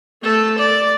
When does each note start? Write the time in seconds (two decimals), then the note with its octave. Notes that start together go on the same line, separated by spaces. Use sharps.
0.23 A3 A4
0.58 D5